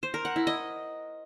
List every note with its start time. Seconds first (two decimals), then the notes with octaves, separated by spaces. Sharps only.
0.03 C5
0.14 A#4
0.25 F#5
0.36 E4
0.47 D#5